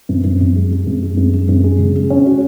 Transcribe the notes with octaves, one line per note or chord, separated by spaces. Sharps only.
F#2
F#2
F#2
G#3
G#3
F#2
G#3
F#2
G#3
F#2
G#3
C#3
G#3
C#4
F#4